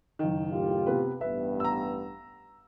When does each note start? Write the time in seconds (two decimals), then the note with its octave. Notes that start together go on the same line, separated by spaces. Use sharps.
0.19 F#1 D#3
0.52 A2 F4 G4
0.87 C3 B3 B4
1.21 A1 G2 B3 B4 E5
1.60 A#5 E6